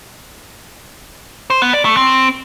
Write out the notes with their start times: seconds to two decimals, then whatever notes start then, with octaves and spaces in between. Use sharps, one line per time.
1.50 C5
1.62 B3
1.73 D5
1.85 A3
1.97 C4